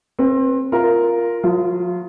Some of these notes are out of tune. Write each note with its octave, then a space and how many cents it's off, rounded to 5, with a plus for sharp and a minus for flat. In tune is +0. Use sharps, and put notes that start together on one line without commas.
C4 +30 B4 -10
F4 +0 A#4 +0
F3 +45 F4 -30